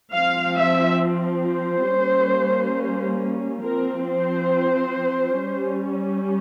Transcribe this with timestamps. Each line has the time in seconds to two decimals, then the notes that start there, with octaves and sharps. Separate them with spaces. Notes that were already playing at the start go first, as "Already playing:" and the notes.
0.13 F3 C4 F5
0.57 E5
1.44 C5
1.89 G3 A#3 C#4
3.65 F3 C4 A#4
4.08 C5
5.40 G3 C#4